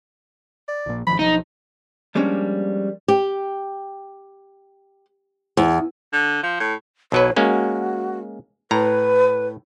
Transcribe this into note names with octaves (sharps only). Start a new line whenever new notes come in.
D5
A#1 A#2
G#1 D#3 F3 B5
B1 E3 F3 D#4 D#5
F3 G3 G#3 A#3 C#4 D4
G4
E2
D3
F3
A2
B1 F#3 B4 C#5
G#3 A#3 C#4 F#4
A2 B4 A#5